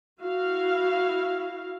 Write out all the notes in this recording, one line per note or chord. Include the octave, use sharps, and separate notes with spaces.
E4 F#4 F5